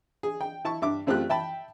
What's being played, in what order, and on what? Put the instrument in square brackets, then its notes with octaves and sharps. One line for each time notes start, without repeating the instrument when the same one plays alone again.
[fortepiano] G#4
G5
E4 A5 C#6
G2 E5 D6
F#2 A3 C4 F4 G4 F#6
E5 G5 A5 B5